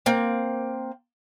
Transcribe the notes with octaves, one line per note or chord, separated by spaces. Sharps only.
A#3 C4